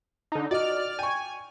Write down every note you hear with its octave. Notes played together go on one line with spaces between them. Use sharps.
D3 D#4
F#4 D5 D#5 F6
G5 G#5 C#6